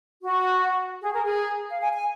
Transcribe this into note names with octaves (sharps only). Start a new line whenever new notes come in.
F#4
G#4
A#4
G#4
F5
G#5
G#5